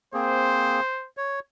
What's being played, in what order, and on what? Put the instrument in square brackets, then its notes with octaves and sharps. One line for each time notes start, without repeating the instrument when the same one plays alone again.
[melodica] A#3 C4 G#4 [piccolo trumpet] C5
[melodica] C#5